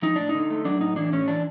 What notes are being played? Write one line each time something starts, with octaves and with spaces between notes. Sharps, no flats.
F3 D#4
A2 D4
D#4
D3
A3
F#3 D4
A2 D#4
E3 D4
A2 C#4
E3 D4